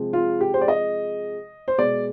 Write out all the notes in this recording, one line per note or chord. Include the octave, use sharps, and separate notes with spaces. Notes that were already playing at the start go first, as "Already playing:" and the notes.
Already playing: C3 F3 G#3
F4
G4
C5
D5
D#5
C5
B2 G#3 D5